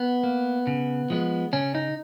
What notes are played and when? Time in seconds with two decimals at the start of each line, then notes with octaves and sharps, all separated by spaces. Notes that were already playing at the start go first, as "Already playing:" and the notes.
Already playing: B3
0.24 A#3
0.67 C#3
1.10 F3 G#3 B3
1.53 C#3 C#4
1.75 D#4